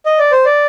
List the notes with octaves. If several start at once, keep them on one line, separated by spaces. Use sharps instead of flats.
D#5
D5
C5
D5